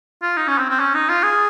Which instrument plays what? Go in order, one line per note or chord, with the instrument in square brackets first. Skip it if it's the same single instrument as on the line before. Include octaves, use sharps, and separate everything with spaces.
[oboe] F4
D#4
C#4
C4
C4
C#4
D#4
F4
G#4